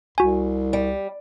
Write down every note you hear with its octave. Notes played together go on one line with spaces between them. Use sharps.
C2 F#4 G#5
G3